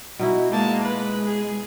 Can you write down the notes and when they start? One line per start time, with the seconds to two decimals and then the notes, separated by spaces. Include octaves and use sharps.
0.19 B2 D#4 E4 F#4
0.51 G#3 A#3 A5
0.82 B4
1.25 G#4